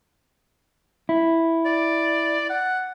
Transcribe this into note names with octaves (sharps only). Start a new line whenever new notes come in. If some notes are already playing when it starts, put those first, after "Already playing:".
E4
D5
F#5